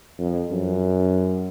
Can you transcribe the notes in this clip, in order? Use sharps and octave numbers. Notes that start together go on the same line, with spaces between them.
F2
F#2